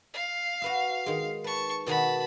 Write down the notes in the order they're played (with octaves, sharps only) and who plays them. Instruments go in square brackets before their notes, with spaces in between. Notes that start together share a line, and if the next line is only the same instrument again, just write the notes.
[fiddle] F5
[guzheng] F#4 B4 E5
D#3 G#3
[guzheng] B4 [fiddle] A5 C#6
[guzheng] B2 D#3 F#4 [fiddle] A5 B5